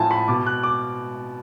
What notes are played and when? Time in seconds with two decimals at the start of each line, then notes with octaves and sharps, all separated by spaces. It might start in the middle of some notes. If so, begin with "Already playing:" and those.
Already playing: A2 F3 G#5 A5
0.11 B5
0.28 B2 D6
0.47 F#6
0.63 D6